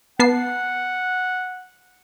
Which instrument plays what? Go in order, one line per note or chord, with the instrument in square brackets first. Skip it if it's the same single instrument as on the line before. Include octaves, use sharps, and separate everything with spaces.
[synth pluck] B3 A5 C7 [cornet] F#5